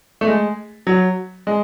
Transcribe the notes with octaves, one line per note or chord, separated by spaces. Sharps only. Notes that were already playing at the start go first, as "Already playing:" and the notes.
A3
G#3
F#3
G#3